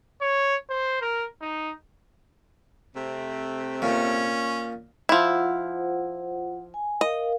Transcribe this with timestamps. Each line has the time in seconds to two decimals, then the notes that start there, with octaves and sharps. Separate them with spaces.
0.21 C#5
0.70 C5
1.01 A#4
1.42 D#4
2.95 C3 A3 C4
3.82 A#2 C#4
5.09 F3 E4 F4 C5 F#5
6.74 G#5
7.01 A#4 D#5 F5